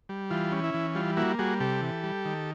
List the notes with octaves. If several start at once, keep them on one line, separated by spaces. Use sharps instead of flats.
G3
E3 F4
C#4
E4
E3
G3 F4
A#3 E4 F#4
G3 F#4 G#4
C3 G4 A4
E3
G3
D#3